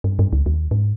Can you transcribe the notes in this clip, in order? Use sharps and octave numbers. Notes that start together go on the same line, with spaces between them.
G2
G2
C#2
D#2
G#2